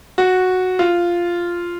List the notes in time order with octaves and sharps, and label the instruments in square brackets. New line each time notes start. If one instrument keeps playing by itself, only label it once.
[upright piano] F#4
F4